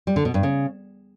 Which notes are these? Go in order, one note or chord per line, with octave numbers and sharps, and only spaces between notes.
G3
D3
B2
G2
C#3